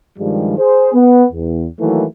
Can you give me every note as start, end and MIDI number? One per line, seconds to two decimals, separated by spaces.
0.19 0.56 43
0.19 0.56 51
0.19 0.56 53
0.19 0.56 55
0.19 0.56 56
0.58 0.93 68
0.58 0.93 72
0.93 1.26 59
1.32 1.67 40
1.80 2.04 51
1.80 2.04 52
1.80 2.04 54
1.80 2.04 57
1.80 2.04 58
1.80 2.04 64